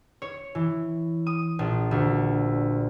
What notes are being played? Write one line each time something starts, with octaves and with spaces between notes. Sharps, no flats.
C#5
E3
D#6
A#1
D2